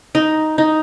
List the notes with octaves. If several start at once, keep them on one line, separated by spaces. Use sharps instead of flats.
D#4
D#4